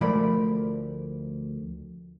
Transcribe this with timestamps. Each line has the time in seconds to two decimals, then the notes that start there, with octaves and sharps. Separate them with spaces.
0.01 D2 F3 A3 A#4 D5 B5